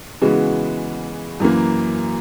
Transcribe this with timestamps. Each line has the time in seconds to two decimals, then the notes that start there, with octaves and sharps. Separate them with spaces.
0.22 C#3 E3 G#3 B3 F#4
1.40 F#2 E3 A#3